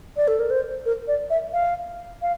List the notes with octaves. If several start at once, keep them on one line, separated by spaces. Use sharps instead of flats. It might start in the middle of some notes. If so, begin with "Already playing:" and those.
D5
A4
A#4
C5
A#4
D5
E5
F5
F5